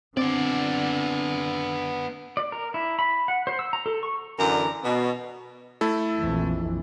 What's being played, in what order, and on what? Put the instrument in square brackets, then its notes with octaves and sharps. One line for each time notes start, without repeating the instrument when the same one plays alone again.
[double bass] D3 [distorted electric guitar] B3 D5 [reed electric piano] C4 D6
[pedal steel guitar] D5
A#4
E4
B5
F#5
C5
E6
A#5
A4
C#6
[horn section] F#2 D3 E3 A#4 D5 A#5
B2
[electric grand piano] A3 E4 A4
[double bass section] A#1 F2 E3